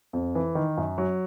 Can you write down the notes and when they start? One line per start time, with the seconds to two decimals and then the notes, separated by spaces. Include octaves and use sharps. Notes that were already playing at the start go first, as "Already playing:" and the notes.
0.13 F2
0.35 E3
0.55 D#3
0.77 F#2
0.98 F#3